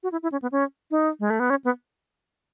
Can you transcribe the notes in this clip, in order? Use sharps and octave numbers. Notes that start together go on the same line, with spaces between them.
F#4
E4
E4
C#4
B3
C#4
D#4
G#3
A3
B3
C#4
B3